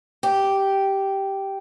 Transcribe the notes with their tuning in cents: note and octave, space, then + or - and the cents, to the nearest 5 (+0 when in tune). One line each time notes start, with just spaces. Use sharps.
G4 -5